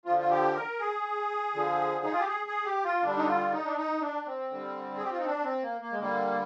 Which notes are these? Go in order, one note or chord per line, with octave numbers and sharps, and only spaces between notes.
D3 F3 F4
F4
G4
A#4
G#4
D3 F3
D#4
F4
G4
G#4
G#4
G4
F4
D3 G3 D4
D#4
F4
D#4
D4
D#4
D4
C4
D3 G3
G#4
G4
F4
D#4
D4
C4
A#3
A#3
G#3
D3 G3 A#3